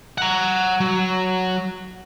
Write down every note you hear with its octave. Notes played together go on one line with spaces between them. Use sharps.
F#5 A#5
F#3